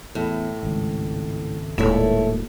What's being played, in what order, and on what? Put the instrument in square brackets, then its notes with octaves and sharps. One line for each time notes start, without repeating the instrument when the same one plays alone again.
[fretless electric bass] E2 [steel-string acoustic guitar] A2
[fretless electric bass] G#1 C#2
[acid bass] D#1 [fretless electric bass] A2 G#3 A#3 [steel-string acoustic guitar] E4 A4 C#5